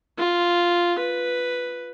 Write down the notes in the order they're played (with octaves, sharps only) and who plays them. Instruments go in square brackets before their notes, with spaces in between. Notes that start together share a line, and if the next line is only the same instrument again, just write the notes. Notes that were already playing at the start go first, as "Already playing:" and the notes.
[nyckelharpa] F4
B4